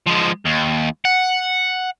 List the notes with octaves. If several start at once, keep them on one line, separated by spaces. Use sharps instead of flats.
F3 G#3
D#2
F#5